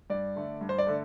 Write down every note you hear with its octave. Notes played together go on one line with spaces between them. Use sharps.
G2 D5
D3 A3
G2
C5
D5
D3 A3